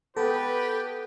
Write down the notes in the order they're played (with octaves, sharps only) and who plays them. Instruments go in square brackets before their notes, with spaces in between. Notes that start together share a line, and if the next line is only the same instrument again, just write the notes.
[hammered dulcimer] B3 G5 [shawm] G4 [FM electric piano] A4 [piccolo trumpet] B4